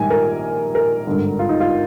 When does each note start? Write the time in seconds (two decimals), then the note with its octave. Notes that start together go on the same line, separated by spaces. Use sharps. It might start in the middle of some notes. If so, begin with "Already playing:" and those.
Already playing: A#1 G#2 D#3 G3 G#5
0.10 A#4
0.75 A#4
1.07 G#1 G2 D3
1.39 F4
1.49 D#4
1.60 F4